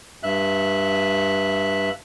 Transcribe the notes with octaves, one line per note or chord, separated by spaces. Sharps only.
G2 E5 F#6